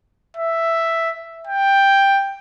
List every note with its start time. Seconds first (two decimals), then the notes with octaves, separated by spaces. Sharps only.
0.37 E5
1.47 G5